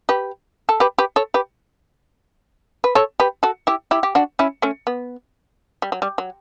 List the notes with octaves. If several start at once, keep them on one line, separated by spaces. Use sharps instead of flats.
G4 B4
A4
G4 B4
G4 B4
A4 C#5
G4 B4
B4
A4 C#5
G4 B4
F#4 A4
E4 G4
E4 G4
G4
D4 F#4
C#4 E4
A3 C#4
B3
G3
F#3
G3
F#3